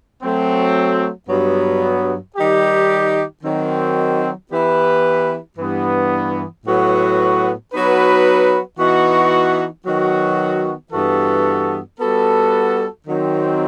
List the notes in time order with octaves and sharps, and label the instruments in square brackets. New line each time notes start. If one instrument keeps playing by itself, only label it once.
[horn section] F#3 A3 C4
G2 F#3 B3
D#3 G3 D#4 G4
D#3 F#3 C4
E3 B3 E4 G4 B4
G2 E3 B3
A2 F#3 B3 F#4 B4
F#3 B3 D#4 F#4 B4
E3 B3 D#4 F#4
D#3 F#3 B3 F#4
G2 E3 B3 F#4 A4
G3 B3 F#4 A4
D#3 F#3 C4